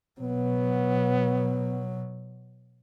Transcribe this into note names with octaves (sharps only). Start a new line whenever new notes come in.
B2 F#3 B3